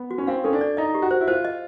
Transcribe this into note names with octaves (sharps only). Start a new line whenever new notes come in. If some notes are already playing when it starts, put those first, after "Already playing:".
Already playing: B3
F#4
C#4
C4 F5
C#4 A4
D4
D5
D#4 D#5
G4
F#4
C5
E4
F4 C5
D#5